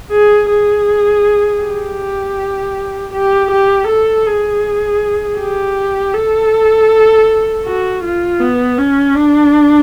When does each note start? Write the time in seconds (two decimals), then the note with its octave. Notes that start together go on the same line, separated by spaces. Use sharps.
0.12 G#4
0.50 G#4
1.62 G4
3.13 G4
3.51 G4
3.88 A4
4.27 G#4
5.39 G4
6.14 A4
7.64 F#4
8.03 F4
8.40 B3
8.78 C#4
9.15 D4